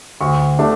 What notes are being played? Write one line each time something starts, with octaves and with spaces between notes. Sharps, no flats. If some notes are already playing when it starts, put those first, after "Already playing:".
D2 C#6
D3 A3 D4